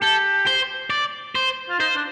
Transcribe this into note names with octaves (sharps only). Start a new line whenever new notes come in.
G4 A4
C5
D5
C5
F4
D#4 C5
D4